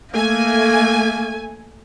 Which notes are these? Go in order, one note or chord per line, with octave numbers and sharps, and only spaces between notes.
A3 A#3 G#5